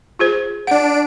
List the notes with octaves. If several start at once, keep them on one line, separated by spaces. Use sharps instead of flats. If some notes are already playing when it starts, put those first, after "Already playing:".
F4 G#4 C5
D4 F#5 D7